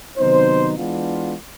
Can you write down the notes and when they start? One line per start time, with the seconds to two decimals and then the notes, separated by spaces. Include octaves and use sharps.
0.17 C3 D#3 F#3 B3 D#4 C5
0.75 E3 G#3 B3 D4 F4